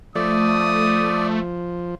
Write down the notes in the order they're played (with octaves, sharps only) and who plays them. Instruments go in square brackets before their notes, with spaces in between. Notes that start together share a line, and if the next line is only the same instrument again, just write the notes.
[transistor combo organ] F3 [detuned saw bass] A3 [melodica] D5 [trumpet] D#6